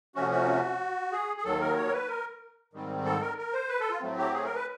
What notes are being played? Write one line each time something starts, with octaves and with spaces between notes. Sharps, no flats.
C3 F3 A3 C#4 F#4
F#4
G#4
G#4
D#2 D#3 F#3 A4
A#4
C#5
A#4
B4
A#4
G#2 D#3 G3 C4
A4
A#4
A#4
C5
B4
A4
F4
A2 F#3 A3 C4
G4
G#4
A#4
B4